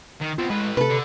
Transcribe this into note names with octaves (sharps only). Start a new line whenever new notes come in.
D#3
B2 C4 F4
A2 G#3 B4
C3 A4 B4
D3